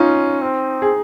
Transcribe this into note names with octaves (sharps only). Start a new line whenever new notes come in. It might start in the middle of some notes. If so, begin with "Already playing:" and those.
Already playing: C#4 D#4 F4
C4
G#4